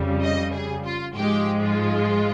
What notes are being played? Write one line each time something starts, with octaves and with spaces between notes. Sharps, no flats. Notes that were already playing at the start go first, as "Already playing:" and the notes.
Already playing: F2 C#3 G3
D#5
G#4
F4
G#2 F3 G#3 G4
F4